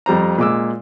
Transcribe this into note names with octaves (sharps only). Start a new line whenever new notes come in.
F2 G3 C5 A#5
A#2 G#3 D6 E6